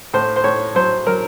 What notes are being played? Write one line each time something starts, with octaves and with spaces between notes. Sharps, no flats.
A2 C5
C5
A2 C#5
F#3 C5
F#3 A#4